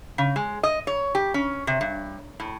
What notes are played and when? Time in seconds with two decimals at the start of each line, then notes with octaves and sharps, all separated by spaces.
0.18 C#3
0.36 G#3
0.63 D#5
0.87 C#5
1.15 G4
1.34 C#4
1.67 C3
1.81 G2
2.40 A2